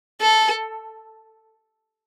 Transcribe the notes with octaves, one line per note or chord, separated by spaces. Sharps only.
A4